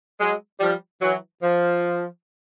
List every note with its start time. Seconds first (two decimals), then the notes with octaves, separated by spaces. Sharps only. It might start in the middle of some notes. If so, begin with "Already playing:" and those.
0.19 F#3 G#3
0.60 F3 G3
1.02 E3 F#3
1.42 F3